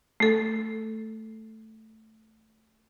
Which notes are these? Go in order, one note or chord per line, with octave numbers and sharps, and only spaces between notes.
A3 A4